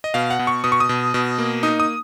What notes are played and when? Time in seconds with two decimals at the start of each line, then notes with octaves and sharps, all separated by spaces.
0.04 D#5
0.14 B2 F5
0.30 F#5
0.39 B2
0.47 C#6
0.64 B2 D#6
0.72 C#6
0.80 D#6
0.89 B2
1.14 B2
1.38 A#3
1.63 D#4 D#6
1.80 D#6